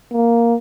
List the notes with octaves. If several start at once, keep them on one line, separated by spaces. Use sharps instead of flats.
A#3